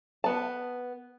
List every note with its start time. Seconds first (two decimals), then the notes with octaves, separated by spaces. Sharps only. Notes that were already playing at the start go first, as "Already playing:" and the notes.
0.24 B3 A5